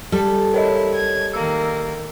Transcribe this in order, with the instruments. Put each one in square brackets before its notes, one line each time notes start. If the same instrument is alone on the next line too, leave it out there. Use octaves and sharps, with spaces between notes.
[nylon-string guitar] G3 [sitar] A4
[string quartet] E4 [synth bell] A#4 C#5 D#5
[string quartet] G#6
[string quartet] D#3 A#3 [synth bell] E6